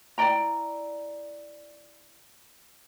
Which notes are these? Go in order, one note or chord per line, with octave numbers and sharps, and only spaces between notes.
E4 D5 G5 A#5